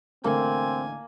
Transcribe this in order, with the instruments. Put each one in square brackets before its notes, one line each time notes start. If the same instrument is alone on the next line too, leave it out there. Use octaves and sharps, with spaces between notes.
[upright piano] A1 D3 A3 [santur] A#3 [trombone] C4 [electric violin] G#5